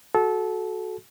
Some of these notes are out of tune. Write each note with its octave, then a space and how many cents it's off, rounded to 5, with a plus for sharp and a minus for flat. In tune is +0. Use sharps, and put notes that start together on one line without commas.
F#4 +0 A4 -20